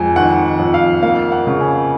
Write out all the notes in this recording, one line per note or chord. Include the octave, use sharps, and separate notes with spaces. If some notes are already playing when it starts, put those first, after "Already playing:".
Already playing: F2 G#3 G#5
D#3 F#5
F2
F5
A#3 F5
F#5
C#3
G#5